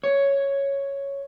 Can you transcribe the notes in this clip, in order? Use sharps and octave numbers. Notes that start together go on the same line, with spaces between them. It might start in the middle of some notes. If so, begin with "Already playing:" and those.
C#5